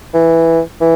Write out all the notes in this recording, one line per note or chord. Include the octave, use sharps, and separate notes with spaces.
E3
E3